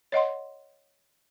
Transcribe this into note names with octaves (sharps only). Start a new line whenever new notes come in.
C#5 D#5 F#5 C6